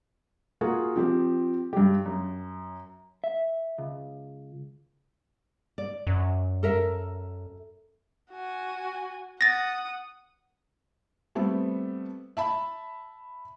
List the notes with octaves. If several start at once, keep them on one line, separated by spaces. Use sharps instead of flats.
A#3 F4 F#4 G#4
F3 C4 G4
G2 G4
F#2
E5
C#2
D5
F#2
A4 A#4 E5
F#4 G#5
F#5 D#6 A6 A#6
G3 A3 B3 C4
E5 A5 B5